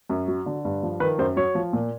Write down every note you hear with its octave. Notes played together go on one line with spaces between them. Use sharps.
F#2
F#3
D3
G2
F3
D#3 B4
F#2 C5
F#3 C#5
F3
A#2